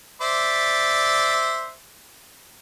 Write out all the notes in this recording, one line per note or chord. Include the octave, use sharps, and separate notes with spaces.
C5 D5 E5